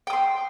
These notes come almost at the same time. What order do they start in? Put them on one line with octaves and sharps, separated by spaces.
G5 D#6 C6